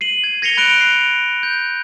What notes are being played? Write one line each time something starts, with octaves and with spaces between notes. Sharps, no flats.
C7 D#7 F#7
G#6
G#6 A#6 C7 C#7 F7 G7
B5 F#6 D7 F7
C7
G6